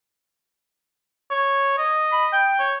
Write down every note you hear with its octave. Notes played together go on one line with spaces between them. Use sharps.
C#5
D#5
B5
G5
C#5